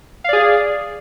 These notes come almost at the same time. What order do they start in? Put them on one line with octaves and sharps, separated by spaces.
F5 D5 G#4